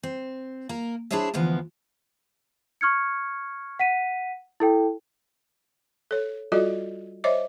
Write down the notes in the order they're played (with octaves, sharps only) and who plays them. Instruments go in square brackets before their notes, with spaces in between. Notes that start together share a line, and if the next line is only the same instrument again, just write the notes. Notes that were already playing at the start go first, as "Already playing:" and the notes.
[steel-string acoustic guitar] C4
A#3 A#4
D4 E4 G#4 C5 C#5 E5
D2 E3 F3 B3
[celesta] C#6 F6 G#6 C#7
F#5 B6 D#7
E4 A4 G5
[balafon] A4 C#5
G3 F4 F#4 A4 D5 D#5
C5 C#5 D#5 E5 D6